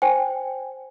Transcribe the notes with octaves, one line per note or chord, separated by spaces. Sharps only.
C5 G5 G#5